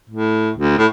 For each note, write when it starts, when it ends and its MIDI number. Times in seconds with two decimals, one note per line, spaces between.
0.10 0.51 45
0.57 0.77 38
0.78 0.86 45